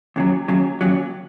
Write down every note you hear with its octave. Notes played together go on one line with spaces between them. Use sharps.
D#2 C#3 F#3
D#2 C#3 F#3
D#2 C#3 F#3